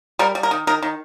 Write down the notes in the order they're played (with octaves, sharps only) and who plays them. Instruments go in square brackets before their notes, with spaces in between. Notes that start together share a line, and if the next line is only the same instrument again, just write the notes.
[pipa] G3 A#4
G3
A#4
D#3
D#3 A#4
D#3